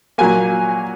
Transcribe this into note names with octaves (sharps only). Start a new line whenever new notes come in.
A#2 F#3 A#3 G#5